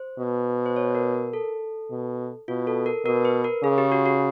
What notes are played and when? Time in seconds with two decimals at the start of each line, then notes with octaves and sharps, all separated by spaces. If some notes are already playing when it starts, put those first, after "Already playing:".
Already playing: C5
0.19 B2
0.66 C5
0.76 C#5
0.95 A#4
1.14 A#4
1.33 A4
1.91 B2
2.48 B2 F4
2.67 A4
2.86 A#4
3.05 B2 A#4
3.25 B4
3.44 A#4
3.63 C#3 G#4
3.78 G4
3.92 F#4
4.06 F#4